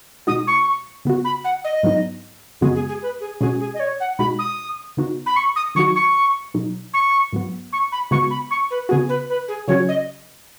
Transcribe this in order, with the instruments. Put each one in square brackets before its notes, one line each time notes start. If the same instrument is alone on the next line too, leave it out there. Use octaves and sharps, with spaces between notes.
[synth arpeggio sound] B2 G#3 D#4 F#4 [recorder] D#6
[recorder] C#6
[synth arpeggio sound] C#3 B3 F#4
[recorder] B5
F#5
D#5
[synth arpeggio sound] G#2 F#3 B3 D#4
[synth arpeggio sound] F#2 C#3 G#3 B3 F#4 [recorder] G#4
[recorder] G#4
G#4
B4
G#4
[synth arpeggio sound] B2 G#3 C#4 F#4 [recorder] G#4
[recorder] G#4
D#5
C#5
F#5
[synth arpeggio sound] B2 G#3 D#4 F#4 [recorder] B5
[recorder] D#6
[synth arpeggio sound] C#3 B3 D#4 F#4
[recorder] B5
C#6
D#6
[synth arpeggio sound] D#3 F#3 D#4 F#4 [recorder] C#6
[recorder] C#6
[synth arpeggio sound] B2 F#3 D#4
[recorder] C#6
[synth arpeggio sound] G#2 F#3 B3
[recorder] C#6
B5
[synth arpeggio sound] C#3 G#3 B3 F#4 [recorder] C#6
[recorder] B5
C#6
B4
[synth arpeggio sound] C#3 B3 F#4 [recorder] G#4
[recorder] B4
B4
G#4
[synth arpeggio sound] C#3 F#3 C#4 F#4 [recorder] C#5
[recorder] D#5